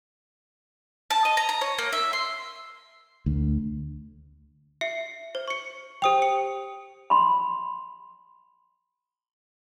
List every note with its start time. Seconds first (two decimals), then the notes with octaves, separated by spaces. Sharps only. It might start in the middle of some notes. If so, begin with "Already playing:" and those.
1.10 A5
1.25 D#5
1.37 A#5
1.49 A#5
1.61 C#5
1.78 A#3
1.93 E5
2.13 C6
3.26 D2
4.81 E5 C7 C#7
5.35 C5
5.48 C#6 C#7
6.02 G4 C5 G5 D#6 F7
6.22 C#7
7.10 B5 C6